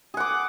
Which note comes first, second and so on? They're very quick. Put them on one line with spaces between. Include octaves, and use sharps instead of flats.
G#4 F#5 D6